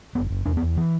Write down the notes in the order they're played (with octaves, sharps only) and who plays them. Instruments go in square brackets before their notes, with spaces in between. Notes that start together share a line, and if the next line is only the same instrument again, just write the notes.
[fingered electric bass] F#1 B3
F#1
E2 D4
B3
E2
E3